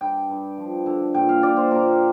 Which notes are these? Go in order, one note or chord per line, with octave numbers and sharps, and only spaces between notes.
G2 G5
G2
F3
D3
A#2 G5
F5
A#2 D5
C5
A#2 A#4